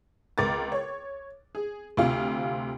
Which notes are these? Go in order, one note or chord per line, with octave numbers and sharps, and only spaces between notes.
C#2 A#4 D6 A6
C#5
G#4
D2 C3 F4